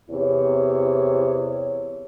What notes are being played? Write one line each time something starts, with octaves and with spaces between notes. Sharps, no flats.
E2 C3 E4 C#5